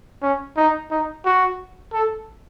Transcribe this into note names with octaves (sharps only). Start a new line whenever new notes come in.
C#4
D#4
D#4
F#4
A4